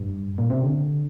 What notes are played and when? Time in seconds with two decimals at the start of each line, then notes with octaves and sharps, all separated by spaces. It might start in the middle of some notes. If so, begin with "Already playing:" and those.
Already playing: G2
0.38 A#2
0.50 C3
0.63 D3